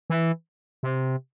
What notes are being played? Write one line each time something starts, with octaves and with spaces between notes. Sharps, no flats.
E3
C3